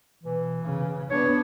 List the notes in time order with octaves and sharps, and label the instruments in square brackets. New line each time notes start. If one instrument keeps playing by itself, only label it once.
[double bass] B2 [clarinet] E3
[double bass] C#3
[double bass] B3 D4 [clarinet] C#5